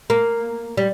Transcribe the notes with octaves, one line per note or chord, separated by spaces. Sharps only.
A#3
G3